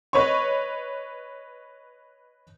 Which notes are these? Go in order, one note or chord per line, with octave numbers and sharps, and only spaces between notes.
B4 C#5 D#5 C#6